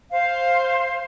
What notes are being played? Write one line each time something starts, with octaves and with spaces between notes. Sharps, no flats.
C5 F5